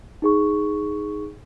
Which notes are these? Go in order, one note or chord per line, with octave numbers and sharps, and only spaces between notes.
D#4 G#4 C#6